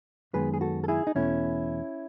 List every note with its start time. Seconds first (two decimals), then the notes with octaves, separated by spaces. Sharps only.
0.33 F#2 D#3 G#3 B3 G#4 B4
0.54 G#4
0.61 F#4 A4
0.84 A4
0.88 E4 G#4
1.07 D#4
1.15 E2 B2 A3 C#4 E4